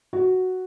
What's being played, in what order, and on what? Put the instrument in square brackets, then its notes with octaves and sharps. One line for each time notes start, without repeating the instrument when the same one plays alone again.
[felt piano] F#4